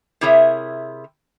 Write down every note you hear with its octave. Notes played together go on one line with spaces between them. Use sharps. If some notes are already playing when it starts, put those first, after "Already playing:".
C3 E4 G#4 A#4 C#5 E5